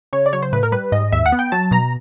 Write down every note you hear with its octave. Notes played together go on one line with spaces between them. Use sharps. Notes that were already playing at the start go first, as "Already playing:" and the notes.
C#3 C#5
D5
F#3 C#5
C5
A2 B4
A#4
G3 B4
G#2 D#5
D#2 E5
F#5
B3
G5
F#3 A5
B2 A#5